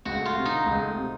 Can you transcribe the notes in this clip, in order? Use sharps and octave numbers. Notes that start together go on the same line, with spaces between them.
C#2 F#4
A3
F4
C3
D#3 D#4
C#2
A3
C3